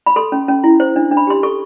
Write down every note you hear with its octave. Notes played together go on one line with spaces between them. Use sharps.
B5
A4 C6
C#4
C#4
E4
C5
D4
D4
B5
G4 C6
A4 C#6